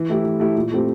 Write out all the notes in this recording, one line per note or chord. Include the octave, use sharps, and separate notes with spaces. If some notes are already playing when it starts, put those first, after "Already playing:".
Already playing: E3
A3 E4 G4
E3
A3 E4 G4
A#2
A3 C4 G4